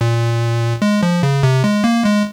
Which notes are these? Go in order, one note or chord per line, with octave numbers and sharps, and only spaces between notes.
A#2
G#3
F3
C#3
C3
G#3
A#3
G#3